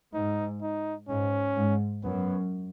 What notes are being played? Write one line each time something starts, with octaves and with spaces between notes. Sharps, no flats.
G#2 D#4
D#4
G#2 C#4
G#2
F#2 B3